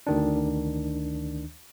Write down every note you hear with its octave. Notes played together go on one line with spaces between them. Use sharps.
D2 D#3 D4